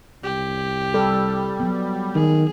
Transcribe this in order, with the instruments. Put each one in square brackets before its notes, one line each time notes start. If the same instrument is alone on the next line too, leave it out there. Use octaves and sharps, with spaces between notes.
[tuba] C2 [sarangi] G4
[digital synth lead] G3 [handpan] A4
[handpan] F#3 B3
[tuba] D#3 [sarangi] G#4